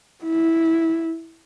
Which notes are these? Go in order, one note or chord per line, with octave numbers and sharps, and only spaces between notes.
E4